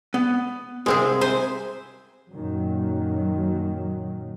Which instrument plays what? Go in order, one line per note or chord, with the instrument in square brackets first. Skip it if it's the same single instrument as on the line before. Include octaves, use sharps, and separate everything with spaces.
[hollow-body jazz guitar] B3
[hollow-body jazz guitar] C2 A#4 E5 [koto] G#3 C4 G#4
[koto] C3 C5 G#5
[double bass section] F#2 A#2 D#3 F#3